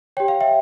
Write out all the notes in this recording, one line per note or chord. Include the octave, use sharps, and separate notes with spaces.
G4 C#5 G5
F5
E5 G5